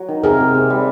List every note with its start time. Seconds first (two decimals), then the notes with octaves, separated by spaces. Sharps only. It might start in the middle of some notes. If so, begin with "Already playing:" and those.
Already playing: F#3
0.09 D#3
0.24 C3 G#4 A#4
0.40 C3
0.55 C3
0.70 G3